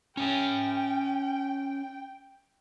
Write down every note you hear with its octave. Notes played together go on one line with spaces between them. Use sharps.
C#4 E5 G5 G#5